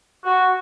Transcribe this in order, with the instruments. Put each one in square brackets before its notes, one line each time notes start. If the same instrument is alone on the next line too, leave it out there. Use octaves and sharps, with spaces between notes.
[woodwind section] F#4